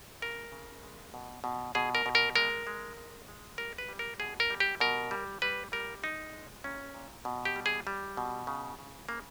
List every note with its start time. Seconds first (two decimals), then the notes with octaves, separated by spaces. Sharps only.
0.22 C#3 A#4
0.52 C#3
0.83 G#3
1.14 B2
1.44 B2
1.75 B2 G#4
1.95 A#4
2.06 B2
2.15 A#4
2.36 G#3 A#4
2.67 G#3
2.97 G#3
3.28 G#3
3.58 G3 A#4
3.78 B4
3.88 G3
3.99 A#4
4.20 B2 G#4
4.40 A#4
4.50 G3
4.60 G4
4.80 B2 A#4
5.11 G3
5.42 G3 B4
5.72 G3 A#4
6.02 G#3 D#4
6.33 G#3
6.64 A#2 C#4
6.94 A#2
7.25 B2
7.45 G4
7.56 G3
7.66 G#4
7.87 G3
8.17 B2
8.47 C#3
8.79 C#3
9.09 C#3 A#3